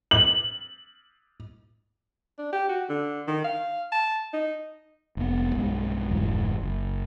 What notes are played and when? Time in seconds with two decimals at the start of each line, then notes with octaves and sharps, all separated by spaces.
0.11 F#7
2.38 D4
2.53 G4
2.69 F#4
2.89 D3
3.28 D#3
3.44 F5
3.92 A5
4.33 D#4
5.17 F1 B3
5.55 B1 G2 G#3
6.10 F1 D2 G#2 E3
6.61 F#1